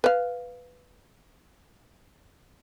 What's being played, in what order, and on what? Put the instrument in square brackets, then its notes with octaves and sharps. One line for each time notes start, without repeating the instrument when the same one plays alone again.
[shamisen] B4 F5